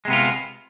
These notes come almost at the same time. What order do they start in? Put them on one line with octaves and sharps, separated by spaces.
G#3 C3 B3 F4